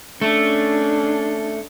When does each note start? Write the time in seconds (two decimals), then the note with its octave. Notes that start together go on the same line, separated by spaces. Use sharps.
0.21 A3 C#4 D4